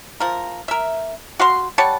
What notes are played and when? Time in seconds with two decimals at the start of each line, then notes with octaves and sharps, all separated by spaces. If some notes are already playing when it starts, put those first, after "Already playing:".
0.20 F3 A#4
0.68 A#4 E5
1.39 F#4 F5 C6
1.78 G3 C#5 F#5 A5